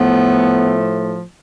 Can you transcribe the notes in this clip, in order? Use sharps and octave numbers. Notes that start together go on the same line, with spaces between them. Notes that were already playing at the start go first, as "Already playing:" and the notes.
Already playing: A2 F3 A3 B3